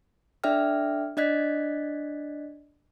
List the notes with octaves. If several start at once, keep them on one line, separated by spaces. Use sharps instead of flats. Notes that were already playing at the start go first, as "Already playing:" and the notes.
D4 A4 D5 E5 G5 F6
D4 D5 D#5 F#6 G#6 B6